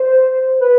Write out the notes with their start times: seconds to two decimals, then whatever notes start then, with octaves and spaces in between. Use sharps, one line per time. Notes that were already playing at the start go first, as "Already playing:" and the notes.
Already playing: C5
0.61 B4